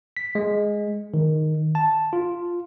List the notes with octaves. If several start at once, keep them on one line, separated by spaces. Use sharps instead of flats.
B6
G#3
D#3
A5
F4